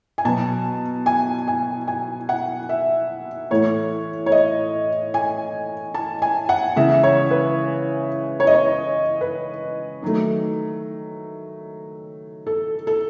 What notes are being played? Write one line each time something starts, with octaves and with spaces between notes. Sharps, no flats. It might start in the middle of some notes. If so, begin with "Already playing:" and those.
G#5
B2 F#3 B3 A5
G#5
G#5
G#5
F#5
E5
A2 E3 A3 C#5
C#5
D#5
G#5
A5
G#5
F#5
C#3 E3 G#3 E5
C#5
B4
C#5
D#5
C#5
B4
D#3 F#3 A3
A4
A4